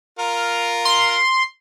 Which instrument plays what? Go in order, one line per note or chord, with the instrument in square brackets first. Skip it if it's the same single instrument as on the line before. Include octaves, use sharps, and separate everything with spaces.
[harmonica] F4 A#4
[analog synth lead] C6